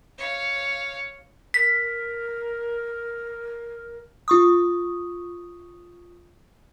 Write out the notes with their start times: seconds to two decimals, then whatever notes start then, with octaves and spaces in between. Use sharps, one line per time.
0.18 C#5 F5
1.54 A#4 B6
4.28 F4 C#6 D#6